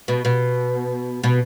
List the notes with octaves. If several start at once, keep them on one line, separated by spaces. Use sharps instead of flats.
B2
B2
B2